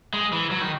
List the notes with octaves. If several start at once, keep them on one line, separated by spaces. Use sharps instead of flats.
G#3
E3
F#3
D#3